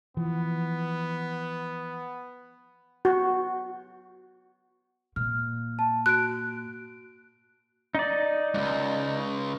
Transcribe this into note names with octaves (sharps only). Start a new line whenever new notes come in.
E3 F3 B3
F#4
A#2 F6
A5
F#4 F#6 D7
D#4 D5
C#2 G#2